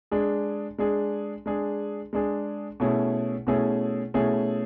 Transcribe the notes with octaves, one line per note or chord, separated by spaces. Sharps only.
G#3 D4 G#4
G#3 D4 G#4
G#3 D4 G#4
G#3 D4 G#4
B2 A3 C#4 E4 G#4
B2 A3 C#4 E4 G#4
B2 A3 C#4 E4 G#4